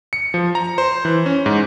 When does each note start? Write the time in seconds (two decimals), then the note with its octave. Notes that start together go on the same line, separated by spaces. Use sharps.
0.13 C#7
0.34 F3
0.55 A#5
0.78 C5
1.05 E3
1.26 C#4
1.46 G#2